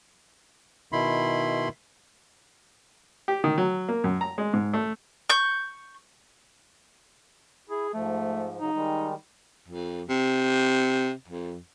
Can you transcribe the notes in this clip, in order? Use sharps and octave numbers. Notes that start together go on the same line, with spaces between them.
B2 D#3 E4 B5 C6
G4
D#3
F#3
A#3
F#2
A#5
G#3
G#2
A3
C#6 G6
E4 G#4
G#2 F3 A3
C#3 F#3 D#4
D#3 G3 G#3
F2
C3
F2